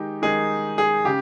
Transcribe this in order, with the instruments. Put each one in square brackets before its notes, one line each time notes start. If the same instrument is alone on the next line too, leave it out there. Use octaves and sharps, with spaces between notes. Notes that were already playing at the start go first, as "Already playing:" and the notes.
Already playing: [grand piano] D#3 G#3 D#4 G4
D#3 G#3 D#4 G#4
G#4
C#3 G4